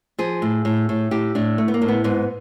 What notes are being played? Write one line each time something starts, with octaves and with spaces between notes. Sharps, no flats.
F3 G#4
A2
A2
A2
A2 G4
A2 D4
A3
B3
A#3
A2
B3
G#2 B3